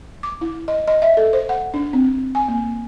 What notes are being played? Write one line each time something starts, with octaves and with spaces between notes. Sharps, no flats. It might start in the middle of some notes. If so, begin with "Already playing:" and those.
D6
E4
D#5
D#5
E5
A4
C5
F#5
D4
C4
G#5
A#3